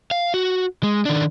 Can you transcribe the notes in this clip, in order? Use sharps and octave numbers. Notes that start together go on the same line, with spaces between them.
F5
F#4
G#3
D#3 D4